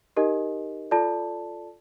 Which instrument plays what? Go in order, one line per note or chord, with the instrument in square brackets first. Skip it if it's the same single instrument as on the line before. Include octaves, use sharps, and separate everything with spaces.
[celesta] D#4 G4 A#4 D#5
F4 A4 D5 A5